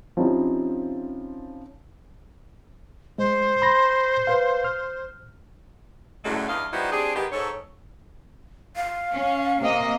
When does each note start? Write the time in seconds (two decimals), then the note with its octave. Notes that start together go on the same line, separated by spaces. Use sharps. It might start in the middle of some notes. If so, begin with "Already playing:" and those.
0.17 F3 C4 C#4 D#4 E4 G4
3.18 G#3 C5
3.62 B5 C6 A#6
4.27 B4 F5
4.64 F6
6.24 F#2 A2 D3 G#3 A3
6.48 E2 G2 E4 D#5 F5
6.72 F3 G3 B3 D#4 E4 F#4
6.91 C4 D4 G4 G#4
7.15 D#3 G#3 B3 G4
7.32 G#2 A4 C#5
8.76 F5
9.13 C#4
9.60 C3 A#3 D#5